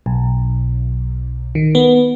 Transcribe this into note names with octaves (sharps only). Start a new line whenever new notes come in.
B1
D#3
B3